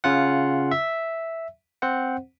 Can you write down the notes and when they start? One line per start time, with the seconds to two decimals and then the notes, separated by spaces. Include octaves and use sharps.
0.04 C#3 C#4 F4 F#5
0.71 E5
1.82 C4 C5 F#5